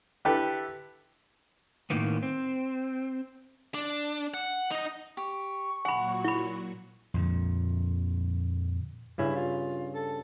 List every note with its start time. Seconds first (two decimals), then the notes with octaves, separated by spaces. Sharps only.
0.25 D3 E4 G4 A4 B4
1.90 A2 D#3 A#3 B3
2.23 C4
3.75 D4
4.34 F#5
4.71 D#4 D#5
5.17 G4 C#6
5.85 A#2 F#3 F#4 F#5 G#5 B5
6.24 E4 B5
7.14 F2 A#2 D3
9.18 G2 C#3 C#4 E4
9.35 F4
9.94 A4